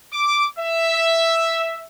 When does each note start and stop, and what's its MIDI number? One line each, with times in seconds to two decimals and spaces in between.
0.13 0.47 86
0.59 1.86 76